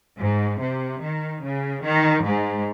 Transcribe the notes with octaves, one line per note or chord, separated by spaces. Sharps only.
G#2
C3
D#3
C#3
D#3
G#2